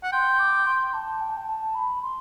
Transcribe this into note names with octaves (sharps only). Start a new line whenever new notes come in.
F#5
G5 C6
D6
C6
A5
G5
A5
G5
A5
B5
C6